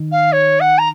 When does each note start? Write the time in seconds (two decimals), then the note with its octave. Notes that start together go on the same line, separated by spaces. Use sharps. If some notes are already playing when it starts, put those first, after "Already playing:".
Already playing: D#3
0.12 F5
0.32 C#5
0.60 F#5
0.78 A#5